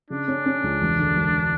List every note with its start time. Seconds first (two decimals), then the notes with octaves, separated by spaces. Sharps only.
0.10 C#3 D4
0.28 C#4
0.46 C#4
0.63 C#2
0.81 E1
0.99 D3
1.16 E1